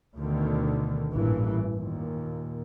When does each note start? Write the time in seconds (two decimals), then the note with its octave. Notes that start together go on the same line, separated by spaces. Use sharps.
0.17 D2 B2 D3 D#3
1.12 A1 G2 A#2 E3
1.74 D#2 A#2